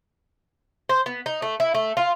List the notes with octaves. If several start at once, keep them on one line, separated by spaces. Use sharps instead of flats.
C5
B3
D#4
A3
E4
A3
F4